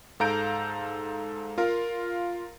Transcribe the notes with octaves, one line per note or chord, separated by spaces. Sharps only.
G#2 A4 F5 A#5 G6 D7
F4 A#4 F5